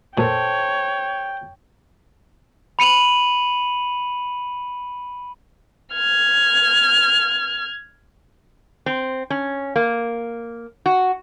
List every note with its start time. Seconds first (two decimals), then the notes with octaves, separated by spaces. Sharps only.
0.18 A#2 A4 C5 C#5 G5 A5
2.79 B5 C#7 D#7 F7 F#7
5.94 F6 G#6
8.86 C4
9.30 C#4
9.76 A#3
10.86 F#4